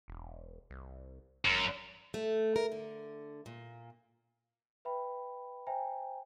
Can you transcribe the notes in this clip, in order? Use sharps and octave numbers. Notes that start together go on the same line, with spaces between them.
E1
C2
G#1 F#2
A3
A#4
D3
A#2
B4 E5 G5 B5
C5 E5 G5 G#5 A#5